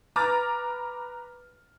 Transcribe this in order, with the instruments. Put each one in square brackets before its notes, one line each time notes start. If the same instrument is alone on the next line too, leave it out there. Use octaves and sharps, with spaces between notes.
[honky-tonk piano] B4 A#5 D6 F6 A6